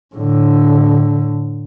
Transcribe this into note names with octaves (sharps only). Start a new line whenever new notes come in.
A2 D3